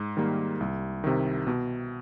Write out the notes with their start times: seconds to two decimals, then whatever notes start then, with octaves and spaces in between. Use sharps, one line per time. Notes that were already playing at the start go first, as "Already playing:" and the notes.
Already playing: G#2
0.17 D#3 G3 A#3
0.60 C2
1.04 C3 D#3
1.47 B2